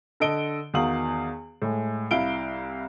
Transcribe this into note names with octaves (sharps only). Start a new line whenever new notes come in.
D3 A4 D#5 D7 G7
E2 D#3 F#4 F5 D#6 F#7
A2 G#3
C2 E4 F5 D7 G7